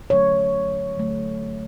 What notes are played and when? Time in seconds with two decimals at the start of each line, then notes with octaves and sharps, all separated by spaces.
0.10 D3 F#3 A3 C#5
0.97 D3 F#3 A3